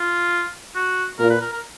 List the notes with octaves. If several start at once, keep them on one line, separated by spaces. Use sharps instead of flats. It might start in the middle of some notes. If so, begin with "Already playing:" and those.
Already playing: F4
F#4
A#2 A#4
B4
A#4
A#4